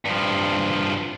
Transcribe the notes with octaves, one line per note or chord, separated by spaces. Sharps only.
G2 F3